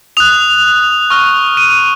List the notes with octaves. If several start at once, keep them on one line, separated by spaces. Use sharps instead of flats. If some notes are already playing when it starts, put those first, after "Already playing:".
D#6 F#6 F7
C#6 F6
D#7